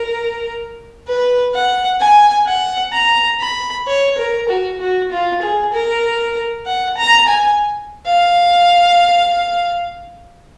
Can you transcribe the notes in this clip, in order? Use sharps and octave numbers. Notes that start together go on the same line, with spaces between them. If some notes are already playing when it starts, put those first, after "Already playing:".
Already playing: A#4
B4
F#5
G#5
F#5
A#5
B5
C#5
A#4
F#4
F#4
F4
G#4
A#4
F#5
A#5
G#5
F5